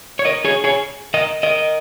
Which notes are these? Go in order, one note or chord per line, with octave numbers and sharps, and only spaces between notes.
C#5
A#4 D#5
G#4 C#5
G#4 C#5
A#4 D#5
A#4 D#5